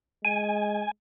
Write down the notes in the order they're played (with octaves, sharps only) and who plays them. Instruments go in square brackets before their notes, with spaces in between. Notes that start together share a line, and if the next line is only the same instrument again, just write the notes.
[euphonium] G#3 [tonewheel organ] G#5